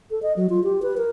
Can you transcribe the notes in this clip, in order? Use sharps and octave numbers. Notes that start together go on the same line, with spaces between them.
A4
D#5
F#3
F4
G4
B4
A#4